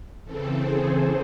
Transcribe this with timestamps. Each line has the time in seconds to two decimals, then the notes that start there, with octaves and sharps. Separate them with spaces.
0.25 C#3 E3 C4 A4
0.55 G#4 C5
0.84 A4